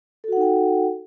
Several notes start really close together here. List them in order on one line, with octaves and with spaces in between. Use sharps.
A4 F#4 F#5 D#4 G5